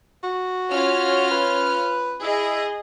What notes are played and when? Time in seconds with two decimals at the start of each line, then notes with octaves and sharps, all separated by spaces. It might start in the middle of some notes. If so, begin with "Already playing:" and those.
0.23 F#4
0.70 C#4 F4 F6
1.31 B4
2.22 E4 G#4 D#5